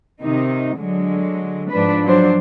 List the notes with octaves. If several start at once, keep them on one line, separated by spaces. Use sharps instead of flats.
C3 D#3 D#4
D3 F#3 G#3
G#2 F3 D4 B4
F3 F#3 D4 C5